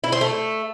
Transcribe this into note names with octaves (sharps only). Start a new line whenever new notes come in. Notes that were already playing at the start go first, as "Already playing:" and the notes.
E4
C5
A3